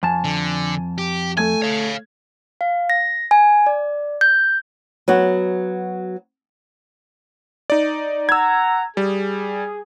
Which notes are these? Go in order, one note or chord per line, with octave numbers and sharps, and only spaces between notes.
F2 G#5 A5
D3
G4
A3 G#5 G#6
C#5 F5
F5
A#6
G#5
D5
G6
F#3 B3 F#4
D#4 D5
F#5 A#5 E6 G#6
G3 G#4